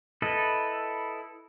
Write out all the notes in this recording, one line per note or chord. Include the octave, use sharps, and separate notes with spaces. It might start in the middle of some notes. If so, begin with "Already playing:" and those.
E4 A4 B4 D#5